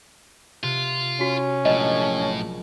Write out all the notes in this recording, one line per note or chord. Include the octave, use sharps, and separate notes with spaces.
C3 F4
C#4 F#4
A#1 A2 F#3 G#3 D#5